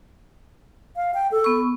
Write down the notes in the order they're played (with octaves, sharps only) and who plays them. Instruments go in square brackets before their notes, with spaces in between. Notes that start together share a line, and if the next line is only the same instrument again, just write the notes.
[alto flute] F5
G5
A4
[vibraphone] B3 C#6